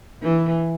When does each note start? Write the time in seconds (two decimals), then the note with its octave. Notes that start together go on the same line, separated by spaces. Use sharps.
0.22 E3